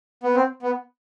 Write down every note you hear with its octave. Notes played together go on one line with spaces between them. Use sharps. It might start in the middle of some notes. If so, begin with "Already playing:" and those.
B3
C4
B3